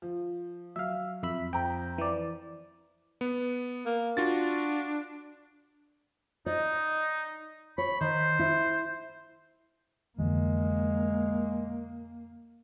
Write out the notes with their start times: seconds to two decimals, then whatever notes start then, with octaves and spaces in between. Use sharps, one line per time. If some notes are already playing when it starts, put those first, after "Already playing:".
0.02 F3
0.76 F#3 E5 F5
1.23 F2 E5 B5
1.53 F2 G5 A#5
1.98 E3 D5
3.21 B3
3.86 A#3
4.17 D4 F4 F#4 A6
6.46 D#4 D5 D#5
7.78 C#5 B5
8.01 D#3 C5
8.39 E4
10.19 F2 D3 E3 G#3 A#3